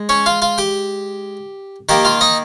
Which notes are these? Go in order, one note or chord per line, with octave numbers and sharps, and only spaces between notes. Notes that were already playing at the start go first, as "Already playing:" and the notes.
Already playing: G#3
C#4 C#5
F4 F5
F4 F5
G4 G5
D#3 A#3 G4 G5
F4 F5
D#4 D#5